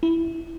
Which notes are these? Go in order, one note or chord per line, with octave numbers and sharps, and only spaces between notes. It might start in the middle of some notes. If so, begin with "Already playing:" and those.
E4